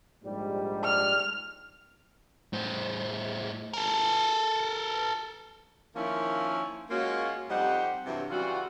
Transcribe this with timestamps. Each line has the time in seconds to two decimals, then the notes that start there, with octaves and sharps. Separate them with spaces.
0.23 A#1 G#2 G3
0.84 F6
2.53 A2 C5
3.74 A4 A#4
5.96 D#3 F3 A#3 C#4 E4
6.90 G#3 A#3 C#4 F4 F#4
7.49 F2 G3 D#4 G4 C5 F#5
8.06 G2 C3 E3 F#3
8.30 C#3 E3 G3 F4 F#4